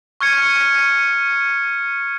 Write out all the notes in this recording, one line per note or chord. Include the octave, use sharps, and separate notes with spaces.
C#6 F6 G#6 C#7